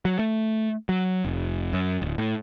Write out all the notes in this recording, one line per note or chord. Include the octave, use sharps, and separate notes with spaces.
F#3
A3
F#3
F1
F#2
D1
A2